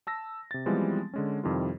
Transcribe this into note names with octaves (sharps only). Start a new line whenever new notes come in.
A5 E6 A#6
C3 A6
E3 F3 G3 G#3 B3 C4
D3 G#3 C#4
F2 C3 D#3 G3 E4 F4